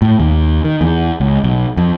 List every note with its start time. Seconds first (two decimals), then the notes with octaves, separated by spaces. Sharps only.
0.02 A2
0.20 D#2
0.64 D#3
0.81 E2
1.20 C#2
1.44 B1
1.77 F2